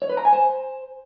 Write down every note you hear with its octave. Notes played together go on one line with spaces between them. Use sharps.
C#5
B4
A#5
G#5
C5